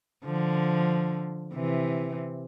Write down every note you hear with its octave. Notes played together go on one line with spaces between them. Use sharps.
D3 F3
C3 E3